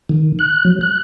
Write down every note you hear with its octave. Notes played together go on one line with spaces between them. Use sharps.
D#3
F#6
F#3
F#6